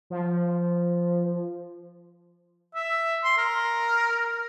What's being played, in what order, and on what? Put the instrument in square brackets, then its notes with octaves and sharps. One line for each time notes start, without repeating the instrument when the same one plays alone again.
[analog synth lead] F3
[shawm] E5
C6
A#4